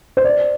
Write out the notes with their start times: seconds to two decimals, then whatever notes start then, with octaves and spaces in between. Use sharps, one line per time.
0.17 C5
0.24 D5